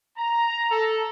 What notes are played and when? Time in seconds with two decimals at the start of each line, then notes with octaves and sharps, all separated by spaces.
0.18 A#5
0.71 A4